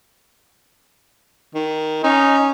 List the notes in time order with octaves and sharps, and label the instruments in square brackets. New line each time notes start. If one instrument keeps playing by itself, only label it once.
[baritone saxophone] D#3
[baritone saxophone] C#4 [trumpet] D#4